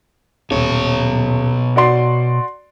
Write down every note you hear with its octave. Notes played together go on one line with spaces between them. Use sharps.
D#1 B2 C#5
F#4 D5 C6